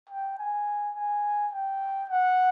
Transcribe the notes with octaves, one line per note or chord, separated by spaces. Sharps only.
G5
G#5
G#5
G5
F#5